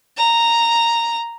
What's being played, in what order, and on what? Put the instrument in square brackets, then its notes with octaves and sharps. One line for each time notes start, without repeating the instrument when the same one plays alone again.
[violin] A#5